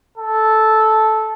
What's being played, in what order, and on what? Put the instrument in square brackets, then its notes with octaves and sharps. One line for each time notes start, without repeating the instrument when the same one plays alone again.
[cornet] A4